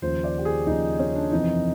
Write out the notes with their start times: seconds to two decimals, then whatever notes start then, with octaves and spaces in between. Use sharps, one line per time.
0.02 D#2 C#3 F3 C5
0.24 D5
0.38 G4
0.45 G#4
0.67 D#2 C#3 F3 D#4
0.99 C#4
1.15 D4
1.32 F2 C3 E3 D#4